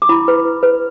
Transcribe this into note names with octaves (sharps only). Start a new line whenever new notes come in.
D6
E4 B5
B4
E4
B4